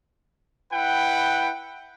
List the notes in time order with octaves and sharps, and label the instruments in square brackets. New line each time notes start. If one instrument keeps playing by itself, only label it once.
[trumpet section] E4 B4 F#5 G5